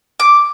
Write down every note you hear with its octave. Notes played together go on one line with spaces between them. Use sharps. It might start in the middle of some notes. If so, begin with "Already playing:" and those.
D6